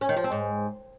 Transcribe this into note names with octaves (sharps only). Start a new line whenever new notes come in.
C#4
D#3
F3
C4
G#2